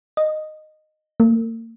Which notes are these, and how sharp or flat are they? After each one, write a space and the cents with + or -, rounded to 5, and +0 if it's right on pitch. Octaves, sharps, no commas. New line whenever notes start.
D#5 -10
A#3 -45